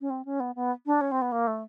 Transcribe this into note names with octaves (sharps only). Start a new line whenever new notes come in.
C#4
C4
C#4
B3
B3
D4
C#4
C4
B3
A#3
A3